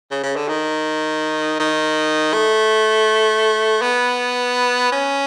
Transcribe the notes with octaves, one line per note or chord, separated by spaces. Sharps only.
C#3
C#3
D3
D#3
D#3
A3
B3
C#4